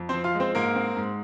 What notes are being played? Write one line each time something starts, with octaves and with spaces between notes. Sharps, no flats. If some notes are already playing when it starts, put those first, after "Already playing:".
Already playing: F2
F3 C4 C5
F4 F5
G#3
C4 C5
G#2 A#3 A#4
C4
G#2